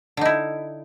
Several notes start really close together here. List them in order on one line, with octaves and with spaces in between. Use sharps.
D3 D#4 E4